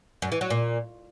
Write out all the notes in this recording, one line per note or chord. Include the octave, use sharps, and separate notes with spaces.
F#2
E3
F#3
A#2